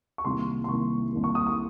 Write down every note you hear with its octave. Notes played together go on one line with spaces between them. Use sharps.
C#6
C2 C3 D#3 A#3 C6
C6
C2 C3 D#3 A#3 C#6
C2 C3 D#3 A#3
C#6
D#6
D#6